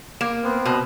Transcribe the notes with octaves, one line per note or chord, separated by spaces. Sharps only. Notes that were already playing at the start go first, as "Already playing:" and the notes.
A#3
B3 C4
B2